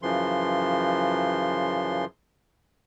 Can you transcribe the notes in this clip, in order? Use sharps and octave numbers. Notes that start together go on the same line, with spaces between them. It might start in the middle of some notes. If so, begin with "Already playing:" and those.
F#2 C#3 E3 F3 C6